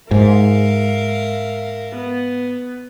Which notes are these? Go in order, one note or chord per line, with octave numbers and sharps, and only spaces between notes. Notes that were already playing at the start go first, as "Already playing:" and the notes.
G#2 A#4 E5 F5
B3